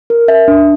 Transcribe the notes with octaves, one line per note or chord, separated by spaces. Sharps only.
A#4
E5
D4